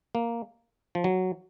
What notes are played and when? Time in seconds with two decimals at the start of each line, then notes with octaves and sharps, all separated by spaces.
0.15 A#3
0.95 F3
1.04 F#3